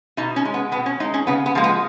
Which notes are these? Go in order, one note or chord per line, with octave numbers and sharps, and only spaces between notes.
B2 D#4
C#4
G#3
B3
B2 B3
C#4
G#3 D#4
C#4
C#3 B3
B3
F3 G#3 A#3
B3